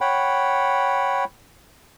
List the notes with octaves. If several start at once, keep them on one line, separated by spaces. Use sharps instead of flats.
C#5 F#5 G5 B5